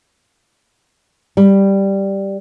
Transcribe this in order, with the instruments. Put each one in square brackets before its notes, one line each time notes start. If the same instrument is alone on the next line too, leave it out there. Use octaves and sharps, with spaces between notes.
[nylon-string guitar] G3